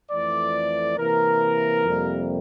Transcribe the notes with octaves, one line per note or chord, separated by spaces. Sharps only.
F2 E3 A3 D5
C3 E3 A#3 A#4
F2 C3 G3 A#3